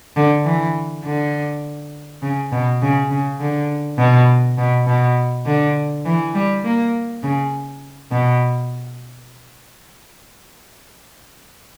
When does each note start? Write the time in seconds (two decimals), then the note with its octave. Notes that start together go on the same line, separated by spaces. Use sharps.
0.16 D3
0.45 E3
1.04 D3
2.22 C#3
2.51 B2
2.82 C#3
3.10 C#3
3.40 D3
3.99 B2
4.58 B2
4.87 B2
5.46 D3
6.05 E3
6.34 G3
6.64 A#3
7.23 C#3
8.11 B2